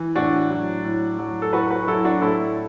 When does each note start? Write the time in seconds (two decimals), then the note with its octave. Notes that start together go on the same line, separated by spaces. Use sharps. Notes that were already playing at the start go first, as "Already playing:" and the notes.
Already playing: E3
0.15 A2 D4 F#4
0.51 F#3
0.84 A2
1.19 F#3
1.42 A4
1.53 A2 F#4 B4
1.70 F#4 B4
1.88 F#3 E4 A4
2.04 D4 F#4
2.21 A2 E4 A4